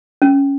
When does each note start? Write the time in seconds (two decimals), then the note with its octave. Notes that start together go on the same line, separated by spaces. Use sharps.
0.22 C#4